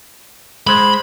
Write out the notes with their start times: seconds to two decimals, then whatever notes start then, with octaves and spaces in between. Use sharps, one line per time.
0.67 G#3 C5 B5